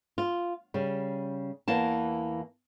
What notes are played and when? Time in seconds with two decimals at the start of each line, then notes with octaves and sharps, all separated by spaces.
0.18 F4
0.74 C#3 G3
1.68 E2 E3 A#3 A5